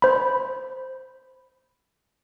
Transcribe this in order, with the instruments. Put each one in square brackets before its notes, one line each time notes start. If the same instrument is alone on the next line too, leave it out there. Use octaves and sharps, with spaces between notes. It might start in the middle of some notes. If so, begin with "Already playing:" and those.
[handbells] C5 B5